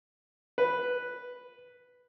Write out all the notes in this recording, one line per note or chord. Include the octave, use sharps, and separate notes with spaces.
B4